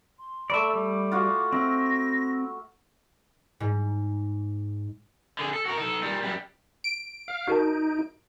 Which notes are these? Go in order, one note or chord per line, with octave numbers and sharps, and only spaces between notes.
C6
A3 D5 E5 B5
G3 D6
F4 F#4 F#5
C4 E5 A#6
G#2
D3 G#4
A4
F#4 A#4
D#4 A4
A#2 G3
F#2 G3
D7
F5
D#4 F#4 A#4 A5